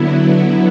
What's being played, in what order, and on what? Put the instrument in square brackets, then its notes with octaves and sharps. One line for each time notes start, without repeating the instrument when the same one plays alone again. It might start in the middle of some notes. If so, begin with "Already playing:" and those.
Already playing: [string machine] D3 F#3 B3 E4